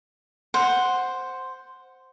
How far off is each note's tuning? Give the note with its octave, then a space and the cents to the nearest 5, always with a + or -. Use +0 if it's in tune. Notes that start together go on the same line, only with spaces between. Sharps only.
C5 +0 F#5 +0